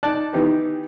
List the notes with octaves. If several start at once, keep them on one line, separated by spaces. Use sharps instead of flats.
D#4 D5 A5 F#6
D#3 E3 B3 D#4 G4 B4